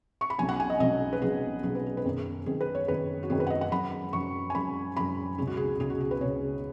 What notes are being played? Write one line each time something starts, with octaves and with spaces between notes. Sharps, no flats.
C#6
B5
B1 B2 F#3 C#4 G#5
F#5
G#5
D#5
B1 B2 F#3 C#4 D#5
B4
B1 B2 F#3 C#4 G#4
B1 B2 F#3 C#4 G#4
B4
G#4
B4
F#2 D#3 B3 G#4
F#2 D#3 B3 G#4
B4
C#5
F#2 D#3 B3 B4
F#4
F#2 D#3 B3 G#4
B4
F#5
D#5
F#5
F#2 F#3 C#4 B5
F#2 F#3 C#4 C#6
G#5
F#2 F#3 C#4 B5
F#2 F#3 C#4 B5
C#2 B2 G#3 C#4 G#4
F#4
G#4
C#2 B2 G#3 C#4 G#4
F#4
G#4
B4
C#2 B2 G#3 C#4 C#5